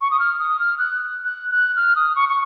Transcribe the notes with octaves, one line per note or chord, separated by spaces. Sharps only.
C#6
D#6
F6
D#6
F6
F#6
F#6
F#6
F6
D#6
C#6
C#6